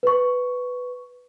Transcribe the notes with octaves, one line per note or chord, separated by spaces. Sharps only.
B4 C#6